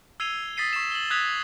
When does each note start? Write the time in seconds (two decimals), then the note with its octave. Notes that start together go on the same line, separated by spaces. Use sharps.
0.20 E6 G#6 C7 D#7 F7 G7
0.57 D#6 A6 B6 C7 D#7
0.73 C#6 B6 E7
0.92 F#7 G7
1.10 D#6 F#6 G#6 A6 B6 F7